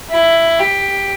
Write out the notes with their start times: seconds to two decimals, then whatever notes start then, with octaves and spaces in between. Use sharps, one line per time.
0.11 E4
0.59 G4